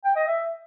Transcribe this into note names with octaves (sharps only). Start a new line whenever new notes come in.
G5
D#5
E5